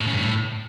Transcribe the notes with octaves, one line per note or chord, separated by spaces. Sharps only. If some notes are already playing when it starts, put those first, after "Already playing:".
A2
C#3
G2
A2